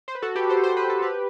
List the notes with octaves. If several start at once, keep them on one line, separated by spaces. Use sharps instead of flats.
C5
B4
F#4 A4
G4 B4
A4 C5
C5
B4
A4
G4 B4